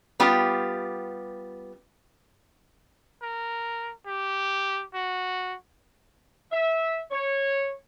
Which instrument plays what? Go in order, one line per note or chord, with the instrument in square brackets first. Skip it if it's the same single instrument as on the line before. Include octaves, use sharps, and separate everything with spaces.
[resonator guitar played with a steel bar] G3 B3 F4 G4
[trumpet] A#4
G4
F#4
[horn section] E5
C#5